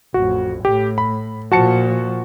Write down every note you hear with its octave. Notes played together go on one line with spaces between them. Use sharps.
A1 F2 F#4
A2 G4
B5
A#2 F3 F#4 A5 C#7